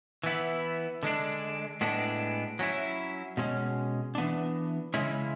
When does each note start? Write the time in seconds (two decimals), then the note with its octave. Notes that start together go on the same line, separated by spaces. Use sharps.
0.24 E3 B3 E4
1.03 D3 G#3 D4
1.81 A2 G#3 B3 D4
2.59 F#3 C#4 E4
3.37 B2 G#3 C#4
4.15 E3 B3 D4
4.94 C#3 G#3 C#4 E4